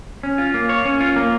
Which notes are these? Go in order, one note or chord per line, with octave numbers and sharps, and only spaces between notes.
C#4
F4
A#3
C#5
C#4
F4
A#3